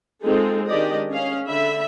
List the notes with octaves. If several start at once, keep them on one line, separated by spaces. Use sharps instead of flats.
G#3 C4 D#4 F4 G#4 A4
D#3 G#3 D4 G4 D5 D#5
C#4 G#4 F5
D3 E5 B5